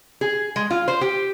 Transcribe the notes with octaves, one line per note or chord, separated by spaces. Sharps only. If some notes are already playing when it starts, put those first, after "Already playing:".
G#4
G#3
F4
C5
G4